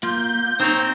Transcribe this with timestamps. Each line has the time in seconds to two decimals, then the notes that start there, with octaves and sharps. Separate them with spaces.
0.03 A#3 F4 G6
0.60 C4 D#4 C5 C#5 A#5